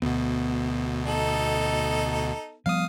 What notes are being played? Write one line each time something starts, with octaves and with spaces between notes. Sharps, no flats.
D2 B2 B3
D#4 A4
F3 G3 B3 F5 D#6